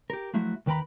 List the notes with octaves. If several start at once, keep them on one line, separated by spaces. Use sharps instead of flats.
G4 A#4
F3 F#3 A3 E4 F#4
D#2 D#3 B4 G5 A#5 B5